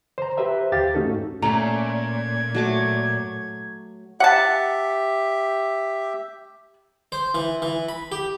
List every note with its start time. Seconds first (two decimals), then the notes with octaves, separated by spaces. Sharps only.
0.18 C5 A#5
0.37 G4 B4 C5 E5 A#5
0.72 D#2 G4 F5 A6
0.94 G#2 A3 C#4 D#4 F#4 A4
1.42 A#2 A3 C#4 A#5 G#6
2.55 F#3 A3 D6
4.20 G4 E5 F#5 A5
7.12 C5
7.35 E3
7.62 E3
7.89 B5
8.12 G4